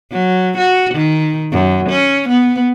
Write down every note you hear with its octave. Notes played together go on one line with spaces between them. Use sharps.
F#3
F#4
D#3
F#2
C#4
B3